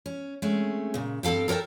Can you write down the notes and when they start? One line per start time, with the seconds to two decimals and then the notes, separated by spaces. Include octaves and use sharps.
0.06 C#4
0.42 G#3 A3 C4 C#4
0.94 A#2 C#3
1.23 G2 C4 A4 F5 G5
1.48 A4 A#4 C#5 G5 A5